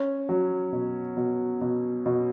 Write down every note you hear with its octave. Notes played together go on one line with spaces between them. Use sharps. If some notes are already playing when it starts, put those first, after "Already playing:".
Already playing: C#4
F#3
B2
B2
B2
B2